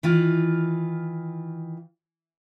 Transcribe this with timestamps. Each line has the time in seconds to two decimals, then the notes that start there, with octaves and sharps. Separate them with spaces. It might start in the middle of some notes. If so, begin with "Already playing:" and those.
0.03 D#3 E3 F4